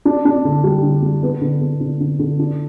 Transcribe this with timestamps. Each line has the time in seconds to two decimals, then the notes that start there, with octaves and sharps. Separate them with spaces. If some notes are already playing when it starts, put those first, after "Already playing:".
0.05 D4
0.25 D4
0.45 D3
0.64 G3
0.83 D3
1.02 G3
1.23 B3
1.41 D3
1.61 B3
1.80 D3
2.00 D3
2.19 D3
2.39 D4